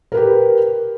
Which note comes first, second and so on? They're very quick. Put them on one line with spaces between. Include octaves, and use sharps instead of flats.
A#4 B4 G4